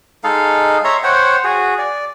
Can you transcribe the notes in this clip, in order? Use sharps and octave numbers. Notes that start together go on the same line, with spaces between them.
G#3 D#4 A4 F5
C#5 E5 A#5 C6
C5 C#5 F#5 G5
F#4 G#4
D5